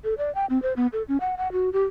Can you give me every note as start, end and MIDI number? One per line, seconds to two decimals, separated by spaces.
0.04 0.14 69
0.18 0.33 74
0.35 0.46 79
0.50 0.61 60
0.62 0.73 72
0.76 0.87 59
0.93 1.03 69
1.08 1.20 61
1.20 1.35 78
1.37 1.51 78
1.52 1.72 66
1.73 1.85 67